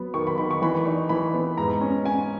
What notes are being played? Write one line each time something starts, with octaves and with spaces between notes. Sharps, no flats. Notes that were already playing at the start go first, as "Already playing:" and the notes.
Already playing: F#3 B3 B5
D#3 C#6
B5
D#3 B5
C#6
E3 B5
D#4 C#6
E3 B5
B3
G#2 A#5
C#4
C#4 G#5